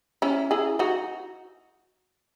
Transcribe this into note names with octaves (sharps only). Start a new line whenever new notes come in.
C#4 E4
E4 G#4
D#4 F#4